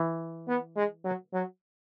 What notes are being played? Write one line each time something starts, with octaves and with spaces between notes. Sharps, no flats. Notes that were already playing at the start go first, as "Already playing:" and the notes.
Already playing: E3
B3
G#3
F#3
F#3